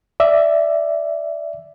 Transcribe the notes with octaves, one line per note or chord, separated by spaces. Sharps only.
D5 E5